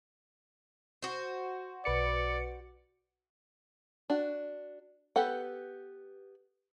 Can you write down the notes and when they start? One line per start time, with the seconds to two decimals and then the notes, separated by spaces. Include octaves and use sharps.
1.02 F#4 C5
1.85 B1 B4 D5 C#7
4.10 D4 F#4
5.16 B3 G4 A4 B4 F#5